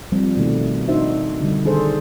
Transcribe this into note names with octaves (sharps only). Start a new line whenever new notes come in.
F3 G3 C4
B2 D#3 A3
D4 D#4 F#4 C5 E5
D3 G3
D#3 D4 G#4 A4 C5